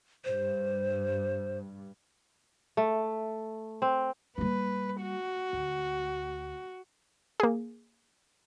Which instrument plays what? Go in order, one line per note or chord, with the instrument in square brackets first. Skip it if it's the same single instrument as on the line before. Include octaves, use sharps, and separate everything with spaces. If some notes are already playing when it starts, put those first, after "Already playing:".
[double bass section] G2 [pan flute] C5
[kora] A3
C4
[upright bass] G3 A#3 [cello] B4
[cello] F#4
[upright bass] D2
[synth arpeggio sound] A#3 G#4